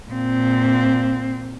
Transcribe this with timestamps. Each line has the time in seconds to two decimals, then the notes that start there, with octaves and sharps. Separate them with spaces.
0.11 A#2 C4